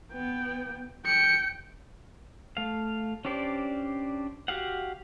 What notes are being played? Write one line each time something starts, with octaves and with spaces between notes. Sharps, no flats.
B3 G5
G5 C#7
A3 F5
C#4 D4 G4 C5 D5
F#4 G4 F5 F#5